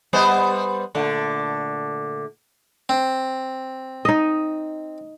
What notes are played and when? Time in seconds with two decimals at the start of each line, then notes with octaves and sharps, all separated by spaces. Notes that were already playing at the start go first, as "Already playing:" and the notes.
0.13 G3 B3 C5
0.95 A#2 D3 A3
2.89 C4
4.05 D#4 D#5